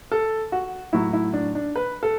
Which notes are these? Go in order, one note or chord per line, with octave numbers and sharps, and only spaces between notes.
A4
F#4
A2 F#3 E4
E4
D4
D4
B4
A4